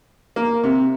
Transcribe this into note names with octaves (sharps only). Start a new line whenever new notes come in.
A#3
C3